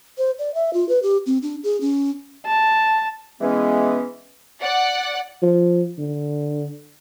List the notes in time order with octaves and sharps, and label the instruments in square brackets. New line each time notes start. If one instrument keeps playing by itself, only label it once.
[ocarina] C5
D5
E5
F4
B4
G4
C4
D4
G#4
C#4
[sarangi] A5
[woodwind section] E3 B3 C#4 [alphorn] G#3
[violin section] D5 F#5
[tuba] F3
D3